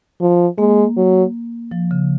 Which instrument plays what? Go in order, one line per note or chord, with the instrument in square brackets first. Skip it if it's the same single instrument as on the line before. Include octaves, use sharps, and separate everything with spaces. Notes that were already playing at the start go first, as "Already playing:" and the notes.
[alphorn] F3
[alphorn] G#3 [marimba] A#3
[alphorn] F#3
[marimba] F3
C#3